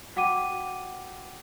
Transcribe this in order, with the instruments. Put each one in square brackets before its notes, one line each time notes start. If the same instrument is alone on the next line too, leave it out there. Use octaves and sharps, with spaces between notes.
[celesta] F#4 F#5 G5 D6 D#7